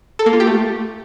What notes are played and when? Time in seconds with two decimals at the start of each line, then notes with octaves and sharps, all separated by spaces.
0.19 A4
0.26 A#3
0.33 F4
0.40 G4
0.47 A3